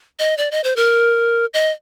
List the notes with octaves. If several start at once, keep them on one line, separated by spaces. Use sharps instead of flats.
D#5
D5
D#5
C5
A#4
D#5